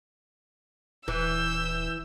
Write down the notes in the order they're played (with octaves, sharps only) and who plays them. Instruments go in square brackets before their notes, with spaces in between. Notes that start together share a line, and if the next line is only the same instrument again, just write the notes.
[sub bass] D#1 [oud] E3 [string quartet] E6 G6